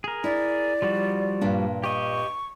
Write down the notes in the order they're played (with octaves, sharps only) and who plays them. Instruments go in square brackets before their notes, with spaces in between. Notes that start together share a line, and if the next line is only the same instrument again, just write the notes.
[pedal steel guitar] G#4 A#4
[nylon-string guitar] E4 [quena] D5
[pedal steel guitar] F3 G3 F#4
[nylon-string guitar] G2 A#2 D4
[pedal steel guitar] G4 D#5 [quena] C#6